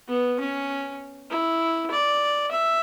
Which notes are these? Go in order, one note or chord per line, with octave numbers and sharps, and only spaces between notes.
B3
C#4
E4
D5
E5